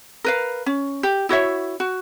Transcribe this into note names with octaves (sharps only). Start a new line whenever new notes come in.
A#4 B4 F5
C#4
G4
E4 F#4 C#5 E5
F#4